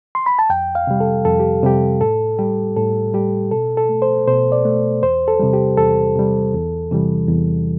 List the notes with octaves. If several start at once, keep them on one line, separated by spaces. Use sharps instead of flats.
C6
B5
A5
F2 G5
F5
C3 G3
A4
F2 A4
G4
C3 G3 G4
A2 A4
G3 G4
A2 A4
G3 G4
B2 A4
A4
A3
C5
B2 C5
D5
A3
E2 C5
A4
C3 G3
G4
E2 A4
C3 G3
E2
C3 E3 G3
E2